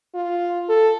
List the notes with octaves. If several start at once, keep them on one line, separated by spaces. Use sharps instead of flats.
F4
A4